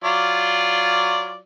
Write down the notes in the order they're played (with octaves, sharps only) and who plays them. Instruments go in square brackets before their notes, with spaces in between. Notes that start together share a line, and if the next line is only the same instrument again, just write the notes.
[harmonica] F#3 F4 D5